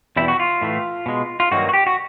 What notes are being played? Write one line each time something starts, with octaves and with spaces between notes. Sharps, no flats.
E2 B2 G3 E4
F#4
F4
A2 E3 A3
B2 G#3
F4
G2 D#3 F#3 A#3 F#4
F#4
G4
F#4